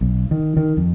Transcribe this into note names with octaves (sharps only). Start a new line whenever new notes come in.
B1
D#3
D#3
F2